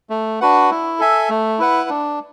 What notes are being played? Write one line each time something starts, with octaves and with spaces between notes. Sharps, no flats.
A3
D4 F#4 B4 F#5
E4
A4 E5 G#5
A3
E4 B4 F#5
D4